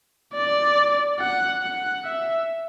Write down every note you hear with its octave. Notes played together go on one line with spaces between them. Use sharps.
D5
F#5
F#5
E5